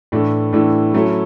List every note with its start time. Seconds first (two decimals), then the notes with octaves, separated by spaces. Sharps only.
0.12 A2 E3 A3 D4
0.53 A2 E3 A3 D4
0.94 F#3 A3 C#4 E4